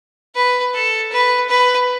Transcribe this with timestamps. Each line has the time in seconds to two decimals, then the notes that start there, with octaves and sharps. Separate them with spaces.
0.35 B4
0.74 A4
1.12 B4
1.49 B4